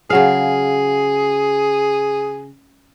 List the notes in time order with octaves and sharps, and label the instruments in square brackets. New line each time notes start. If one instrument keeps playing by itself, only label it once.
[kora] C#3 F#3 F5 [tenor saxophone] G#4